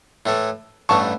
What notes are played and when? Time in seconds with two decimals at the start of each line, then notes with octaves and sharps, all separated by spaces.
0.26 A2 E3 A3
0.89 A1 G2 E3 A3 A5 C#6